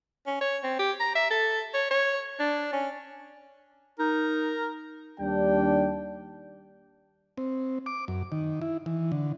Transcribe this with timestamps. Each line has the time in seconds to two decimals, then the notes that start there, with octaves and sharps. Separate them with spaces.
0.27 C#4
0.41 C#5
0.64 C4
0.79 G4
1.00 A#5
1.16 E5
1.31 A4
1.74 C#5
1.91 C#5
2.39 D4
2.73 C#4
3.99 D#4 A#4
5.20 D#2 G3 D4 G5
7.38 C4
7.86 D6
8.08 F#2
8.32 D#3
8.62 E4
8.86 E3
9.12 D3